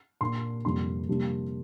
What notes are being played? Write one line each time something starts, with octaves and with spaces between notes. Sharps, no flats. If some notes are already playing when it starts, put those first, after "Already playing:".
A#2 A#3 D4 C6
F2 C3 G3 A#3 D4 C6
F2 C3 G3 A#3 D4